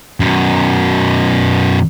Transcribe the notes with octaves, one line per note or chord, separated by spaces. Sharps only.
F#2 B2